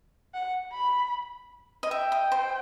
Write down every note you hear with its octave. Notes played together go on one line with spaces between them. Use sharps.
F#5
B5
D#5
E5 G5
D#5
C5